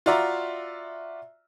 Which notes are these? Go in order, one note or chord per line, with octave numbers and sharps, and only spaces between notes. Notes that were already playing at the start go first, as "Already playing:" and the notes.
F4 F#4 D5 E5 A#5